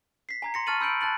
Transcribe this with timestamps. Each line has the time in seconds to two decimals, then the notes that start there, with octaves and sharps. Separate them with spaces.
0.29 B6 C7
0.42 G#5 A#5 G#6
0.54 C6 A#6 C#7
0.67 A5 C#6 F6 A6 D#7 F#7
0.81 B5 E6 G6 C#7 D7 F#7
1.01 A5 F#6 A6 F#7